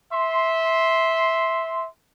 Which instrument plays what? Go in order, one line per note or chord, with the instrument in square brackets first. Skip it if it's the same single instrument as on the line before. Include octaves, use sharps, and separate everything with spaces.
[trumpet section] E5 C6